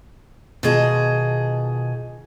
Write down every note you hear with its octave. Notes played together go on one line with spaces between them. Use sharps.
B2 D#3 F4 G#4 D#5 A5